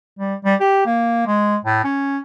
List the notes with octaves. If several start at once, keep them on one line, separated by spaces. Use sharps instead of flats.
G3
G3
G4
A#3
G#3
A2
C#4